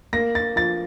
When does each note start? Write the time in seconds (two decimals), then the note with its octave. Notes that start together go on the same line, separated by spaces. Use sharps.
0.13 A#3 A#6
0.35 A6
0.56 F3 A6